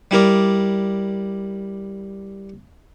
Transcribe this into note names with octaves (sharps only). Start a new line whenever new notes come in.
G3 E4 A#4 D5